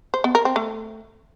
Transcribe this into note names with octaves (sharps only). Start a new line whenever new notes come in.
C5
B3
A#4
C4
A3